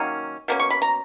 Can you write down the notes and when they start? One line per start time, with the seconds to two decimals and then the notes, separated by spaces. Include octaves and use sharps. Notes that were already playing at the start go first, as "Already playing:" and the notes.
Already playing: D#3 F#3 A#3 C#4
0.48 B2 A#3 C#4
0.59 C#6
0.70 B5
0.82 A#5